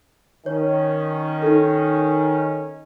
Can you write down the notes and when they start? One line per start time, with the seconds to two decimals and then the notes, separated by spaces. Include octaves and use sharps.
0.46 D#3 C#4 C#5
1.42 D#4 A4